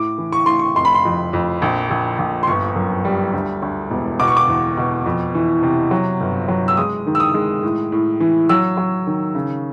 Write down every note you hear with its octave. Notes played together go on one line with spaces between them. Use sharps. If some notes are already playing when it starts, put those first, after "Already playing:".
Already playing: A2 D6
E3
C#6
A2 C6
C#6
F1 C6
B5
C6
F2
F2
A#1
A#1
A#1
C6
G1 C#6
F#2
G3
D2
D2
E1
B2 D6
C#6
D6
E2
B2
F2
E3
C3
F#3
G1
F#3
E6
G#3 D#6
D#3
E6
D#6
G#3
A2
A2
E3
F#3 E6
F#3
D#3
C#3